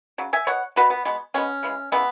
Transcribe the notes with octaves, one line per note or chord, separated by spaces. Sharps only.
C#3 F#3
E5 G#5
B2 B3 C#5 F#5
B2 B3 F#4 B4
B3
B2 G#3 B3
B2 G#3 B3 C#4
C#3 E3 G#3
C#3 E3 G#3 B3